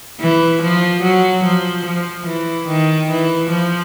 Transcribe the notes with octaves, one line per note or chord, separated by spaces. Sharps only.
E3
F3
F#3
F3
F3
E3
D#3
E3
F3